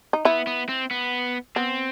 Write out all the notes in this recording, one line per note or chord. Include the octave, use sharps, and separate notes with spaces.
D#4
B3 E4
B3
C4
B3
B3 C4